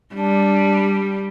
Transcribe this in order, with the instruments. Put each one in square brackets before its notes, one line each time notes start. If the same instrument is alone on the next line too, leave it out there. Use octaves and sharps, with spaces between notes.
[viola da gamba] G3 [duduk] D4